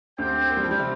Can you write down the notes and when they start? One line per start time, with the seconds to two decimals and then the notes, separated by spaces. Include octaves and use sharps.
0.18 D2 D3 C4 G4 C5 G5
0.50 A#3
0.57 G3
0.64 F3
0.71 G3
0.79 C3 C4